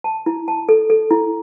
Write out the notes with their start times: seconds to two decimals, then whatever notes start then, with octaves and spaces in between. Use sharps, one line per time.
0.04 A5
0.26 E4
0.48 A5
0.69 A4
0.90 A4
1.11 E4